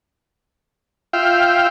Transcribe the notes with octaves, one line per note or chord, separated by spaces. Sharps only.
F4 E5 F5 G5